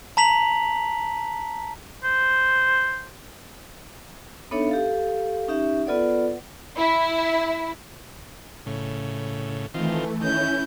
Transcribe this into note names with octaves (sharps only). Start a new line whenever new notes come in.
A5 A#5 B6 F7 F#7
C5
B3 D4 D#4 A4 C#5 E5
G4 A4 F5
C#4 D#4 G4 E5
B3 F4 A4 B4 D5 F#5
E4
A2 C#3
D#3 E3 A3 C4 F4
D#3 C#4 E4 G6